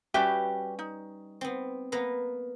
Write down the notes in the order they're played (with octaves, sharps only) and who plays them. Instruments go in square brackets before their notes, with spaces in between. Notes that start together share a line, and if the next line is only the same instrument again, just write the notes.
[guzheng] G3 C#4 B4 [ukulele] F#4 G4 E5
[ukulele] D#4
[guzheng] B3 C4
A#3 B3 B4